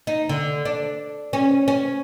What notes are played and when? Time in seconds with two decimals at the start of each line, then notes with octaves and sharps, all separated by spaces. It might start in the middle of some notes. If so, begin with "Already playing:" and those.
0.07 D#4
0.29 D3
0.65 D4
1.33 C#4
1.68 C#4